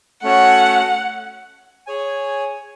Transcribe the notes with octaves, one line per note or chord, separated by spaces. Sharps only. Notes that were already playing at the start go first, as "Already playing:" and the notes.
A3 C#4 F#4 C#5 F#5
G#4 C#5 G#5